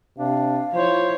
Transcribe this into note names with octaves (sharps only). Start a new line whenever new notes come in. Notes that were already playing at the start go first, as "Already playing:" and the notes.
C3 D4 F5
F3 E4 C5 C#5